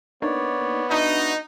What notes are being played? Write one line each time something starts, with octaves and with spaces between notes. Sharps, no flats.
A#3 B3 D4 D#4 C#5 D5
D4 D#4 F#4 E5